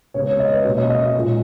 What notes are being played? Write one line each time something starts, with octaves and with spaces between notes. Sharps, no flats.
C#3 G#3 B3 C#5
C#5
D#5
B4
B2 A#3 C#4 C#5
D#5
D#5
A#2 F3 G#3 C#4